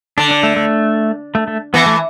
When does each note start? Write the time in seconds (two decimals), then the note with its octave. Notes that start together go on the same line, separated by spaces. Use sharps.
0.18 D3 D4
0.31 D4
0.43 A3
0.56 A3
1.35 A3
1.48 A3
1.74 E3 B3
1.86 A3